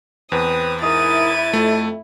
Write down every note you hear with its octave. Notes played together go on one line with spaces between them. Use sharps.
E2 C4 B4 D#6
G#2 E4 A#4 D#6 A6 D#7
F2 A3